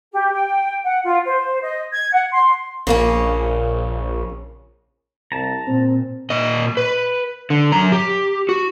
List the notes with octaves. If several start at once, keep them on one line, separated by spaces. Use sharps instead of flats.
G4
G5
F#5
F4
C5
D#5
G#6
F#5
C6
A#1 C#3 A#3 C#4
C2 A5 A#5
A#2 C4
A#2 D#5
B4
D3
F#2 A#5
G4
F#4